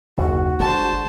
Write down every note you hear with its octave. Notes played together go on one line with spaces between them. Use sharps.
F#1 D#2 F#4
G1 D3 G#3 C5 A5